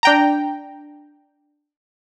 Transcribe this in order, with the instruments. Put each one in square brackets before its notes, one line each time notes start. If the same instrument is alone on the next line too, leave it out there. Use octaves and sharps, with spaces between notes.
[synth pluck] D4 G5 A#5